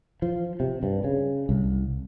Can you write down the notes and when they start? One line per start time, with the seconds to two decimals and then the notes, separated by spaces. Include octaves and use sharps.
0.22 F3
0.60 C3
0.83 G2
1.04 C#3
1.49 C2